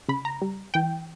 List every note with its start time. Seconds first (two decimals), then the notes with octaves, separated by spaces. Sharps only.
0.08 C#3 B5
0.25 A#5
0.42 G3
0.74 E3 G5